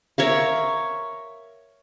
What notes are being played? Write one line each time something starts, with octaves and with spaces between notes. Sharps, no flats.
A#4 C#5 E5 F5